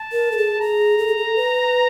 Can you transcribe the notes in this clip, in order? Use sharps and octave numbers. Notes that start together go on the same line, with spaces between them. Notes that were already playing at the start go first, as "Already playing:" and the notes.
Already playing: A5
A#4
A4
G#4
G#4 A#5
A4
G#4
A4
B4